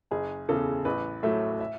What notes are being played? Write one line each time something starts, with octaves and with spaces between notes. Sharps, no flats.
F#1 G#4
E2 C#3 A4
A1 B4
A2 F#3 A3 E5
E5